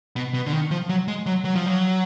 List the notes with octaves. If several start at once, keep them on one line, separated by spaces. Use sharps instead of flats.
B2
B2
D3
D#3
F3
F#3
G#3
F#3
F#3
F3
F#3